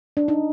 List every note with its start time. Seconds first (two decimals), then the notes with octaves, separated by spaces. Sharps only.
0.17 D4
0.28 D#4